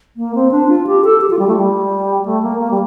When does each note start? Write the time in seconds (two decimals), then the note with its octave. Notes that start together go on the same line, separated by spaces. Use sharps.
0.17 A#3
0.35 C4
0.51 D4
0.69 F4
0.87 G4
1.05 A4
1.21 G4
1.30 F4
1.39 G3
1.48 A3
1.57 G3
2.25 A3
2.43 A#3
2.60 A#3
2.71 G3